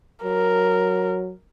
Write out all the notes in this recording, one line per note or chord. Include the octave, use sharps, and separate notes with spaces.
F#3 A#4